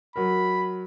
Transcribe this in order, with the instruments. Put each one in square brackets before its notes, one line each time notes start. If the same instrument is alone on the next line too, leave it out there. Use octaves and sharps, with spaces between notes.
[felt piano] F#3 A#4 [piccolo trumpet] B5